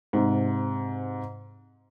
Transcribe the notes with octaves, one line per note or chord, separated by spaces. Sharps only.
G#2 C3